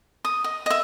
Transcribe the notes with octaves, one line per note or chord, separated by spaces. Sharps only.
D#6
D#5
D#5 E5